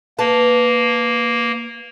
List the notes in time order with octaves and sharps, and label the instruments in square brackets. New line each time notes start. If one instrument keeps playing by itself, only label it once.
[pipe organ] A#3 [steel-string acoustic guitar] B4 A5